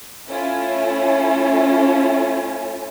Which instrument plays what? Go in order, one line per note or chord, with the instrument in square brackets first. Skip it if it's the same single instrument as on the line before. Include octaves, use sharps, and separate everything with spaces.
[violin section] A3 C#4 E4 F4 C#5 G#5